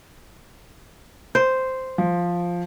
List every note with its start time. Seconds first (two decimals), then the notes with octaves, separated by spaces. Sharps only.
1.35 C5
1.98 F3